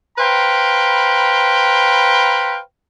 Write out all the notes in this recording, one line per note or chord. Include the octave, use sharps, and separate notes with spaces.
B4 C5 F5 G5 A#5 B5